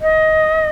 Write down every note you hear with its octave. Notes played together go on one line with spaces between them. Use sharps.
D#5